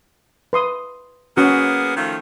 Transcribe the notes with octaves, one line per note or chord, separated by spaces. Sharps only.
B4 C6 D#6
A#3 B3 C#4 F#4 G#4
D#3 F3 A3